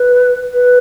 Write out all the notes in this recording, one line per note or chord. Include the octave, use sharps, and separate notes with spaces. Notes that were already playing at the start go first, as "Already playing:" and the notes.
Already playing: B4
B4